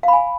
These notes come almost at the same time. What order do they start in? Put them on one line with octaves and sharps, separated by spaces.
F5 B5 G#5